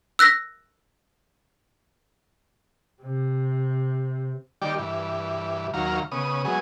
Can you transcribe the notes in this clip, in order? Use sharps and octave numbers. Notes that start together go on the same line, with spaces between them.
E6 F#6 A#6 B6
C3
D#3 G3 G4 D5
G2 E3
D#2 F#3 F5 A#5
C#3 B3 D#6
F#3 G#3 B3 G#4